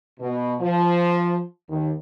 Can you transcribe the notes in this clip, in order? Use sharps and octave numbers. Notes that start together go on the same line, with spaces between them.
B2
F3
D#2